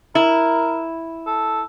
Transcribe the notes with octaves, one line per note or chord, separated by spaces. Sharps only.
E4 A#4
A4